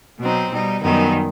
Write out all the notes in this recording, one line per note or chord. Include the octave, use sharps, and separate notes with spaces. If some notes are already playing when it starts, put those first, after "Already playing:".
B2 F#3 C4 D#4
B2 G3 D#4
F#2 D#3 G3 B3 D#4